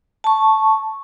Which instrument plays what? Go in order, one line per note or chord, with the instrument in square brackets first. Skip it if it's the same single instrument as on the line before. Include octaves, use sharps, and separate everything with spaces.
[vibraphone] A5 C#6